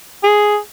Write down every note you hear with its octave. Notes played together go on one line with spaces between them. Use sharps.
G#4